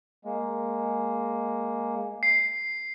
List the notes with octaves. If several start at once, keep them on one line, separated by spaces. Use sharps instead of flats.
G#3 A#3
C7